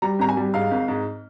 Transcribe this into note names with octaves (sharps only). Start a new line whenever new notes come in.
G3 A#5
G#1 A#5
G#5
G3
G#2 F5
G#1
G#2